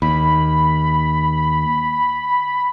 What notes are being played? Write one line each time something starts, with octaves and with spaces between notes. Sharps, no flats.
D#2 B5